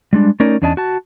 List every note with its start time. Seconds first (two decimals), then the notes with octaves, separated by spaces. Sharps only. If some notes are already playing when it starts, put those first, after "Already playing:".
0.13 G3 G#3 D4
0.40 A3 C#4 D#4 A#4 D5
0.62 E2 C#4 D4 D#5 G#5 A5
0.77 F#4 A5